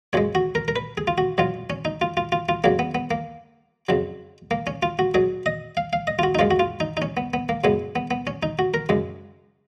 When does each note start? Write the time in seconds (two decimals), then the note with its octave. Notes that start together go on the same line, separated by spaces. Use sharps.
0.13 F#2 F3 G#3 C#5
0.35 F#4
0.55 A#4
0.68 A#4
0.76 B4
0.97 G#4
1.07 F4
1.18 F#4
1.38 B2 F#3 F4
1.70 C#4
1.85 D#4
2.01 F4
2.17 F4
2.32 F4
2.49 F4
2.64 F2 C#3 F#3 A#3
2.79 B3
2.95 B3
3.11 A#3
3.89 F2 C#3 F#3
4.51 A#3
4.67 C#4
4.83 F4
4.99 F#4
5.14 B2 F#3 G#4
5.46 D#5
5.77 F5
5.93 F5
6.07 D#5
6.19 F4
6.23 F#4
6.35 D#4
6.39 F#2 F3 G#3 F4
6.51 F#4
6.59 F4
6.80 D#4
6.97 D#4
7.02 C#4
7.17 B3
7.34 B3
7.49 A#3
7.64 F#2 C#3 G#3 B3
7.96 B3
8.11 B3
8.27 C#4
8.43 D#4
8.59 F#4
8.74 A#4
8.89 F#2 C#3 G#3